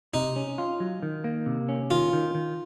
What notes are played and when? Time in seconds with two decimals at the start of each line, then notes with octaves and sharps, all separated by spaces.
0.14 C3 D#4
0.36 C#4
0.58 F4
0.80 F#3
1.03 D#3
1.24 A#3
1.46 C3
1.69 C#4
1.91 D#3 F4
2.13 D#3
2.35 D#3